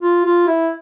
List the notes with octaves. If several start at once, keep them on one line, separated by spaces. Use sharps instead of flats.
F4
F4
E4